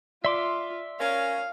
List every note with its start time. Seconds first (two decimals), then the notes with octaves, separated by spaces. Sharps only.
0.25 F4 D5 E5 C6 D6
1.00 C#4 A#4 F5